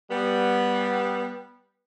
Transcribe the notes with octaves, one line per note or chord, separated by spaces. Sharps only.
G3 B3